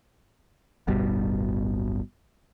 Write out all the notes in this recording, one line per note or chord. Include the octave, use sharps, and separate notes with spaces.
D1 G1 B2 G3